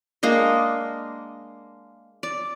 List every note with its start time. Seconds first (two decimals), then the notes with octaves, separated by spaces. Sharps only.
0.23 G#3 A#3 D4 D#5
2.23 D5